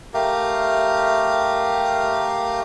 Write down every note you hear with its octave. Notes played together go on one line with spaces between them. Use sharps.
A3 G4 A#4 F5